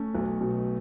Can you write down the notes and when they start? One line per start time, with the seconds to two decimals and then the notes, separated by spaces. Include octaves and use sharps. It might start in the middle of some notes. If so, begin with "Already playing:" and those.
Already playing: A3 C#4
0.15 B1
0.41 B2